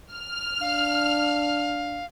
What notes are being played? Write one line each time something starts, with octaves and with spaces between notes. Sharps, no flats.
F6
D4 F5